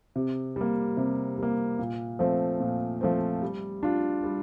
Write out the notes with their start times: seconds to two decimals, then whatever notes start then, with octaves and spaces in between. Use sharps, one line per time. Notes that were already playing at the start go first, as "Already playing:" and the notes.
0.16 C3
0.56 G3 A#3
0.97 C3
1.38 G3 A#3
1.79 A#2
2.19 F3 A3 C4
2.60 A#2
3.01 F3 A3 C4
3.42 G3
3.83 D4 F4
4.24 G3